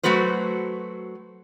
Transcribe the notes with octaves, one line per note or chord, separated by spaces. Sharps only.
F#3 A3 F#4 B4 C5